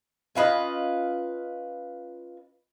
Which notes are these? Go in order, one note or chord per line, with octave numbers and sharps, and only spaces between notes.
C#4 F4 B4 D#5